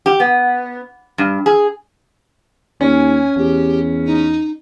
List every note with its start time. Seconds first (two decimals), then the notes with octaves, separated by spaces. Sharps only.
0.06 G4
0.20 B3
1.18 G2
1.46 G#4
2.81 D#2 C#4 G#5
3.37 E2 G4
4.06 D#4